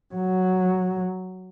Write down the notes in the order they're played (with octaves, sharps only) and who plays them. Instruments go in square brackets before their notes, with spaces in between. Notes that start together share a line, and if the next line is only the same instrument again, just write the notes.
[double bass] F#3